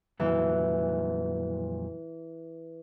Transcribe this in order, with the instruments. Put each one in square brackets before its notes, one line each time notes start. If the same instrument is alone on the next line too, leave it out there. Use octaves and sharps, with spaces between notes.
[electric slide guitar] F2 A#2 F#3 [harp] E3